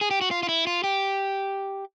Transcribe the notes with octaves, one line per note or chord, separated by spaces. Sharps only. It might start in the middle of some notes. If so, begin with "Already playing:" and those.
G#4
G4
F#4
F4
F4
E4
F4
G4